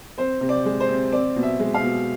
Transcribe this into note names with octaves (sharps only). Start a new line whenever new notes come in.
C4 C5
C3
D5
G#3
C5
C3
C4 D5
B2
E5
G#3
F5
B2